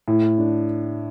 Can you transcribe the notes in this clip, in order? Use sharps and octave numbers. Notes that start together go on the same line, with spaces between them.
A2
D4